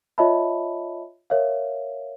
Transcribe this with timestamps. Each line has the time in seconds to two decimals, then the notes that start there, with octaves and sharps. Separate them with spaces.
0.18 F4 C#5 D#5 E5 A5 B5
1.30 A#4 C#5 E5 F5